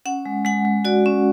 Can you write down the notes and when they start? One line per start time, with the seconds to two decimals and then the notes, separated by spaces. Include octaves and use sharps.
0.06 C#4 F#5
0.26 G#3
0.45 G#3 F#5
0.65 G#3
0.85 F#4 D5
1.06 C#4